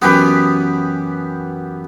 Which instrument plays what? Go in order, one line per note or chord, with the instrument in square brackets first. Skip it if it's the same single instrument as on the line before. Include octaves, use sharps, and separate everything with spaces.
[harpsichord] F#2 E3 F#4 [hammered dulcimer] B3 G4 B4